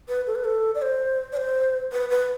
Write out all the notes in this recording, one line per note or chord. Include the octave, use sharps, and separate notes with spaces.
B4
A4
B4
A4
D5
C5
D5
C5
B4
B4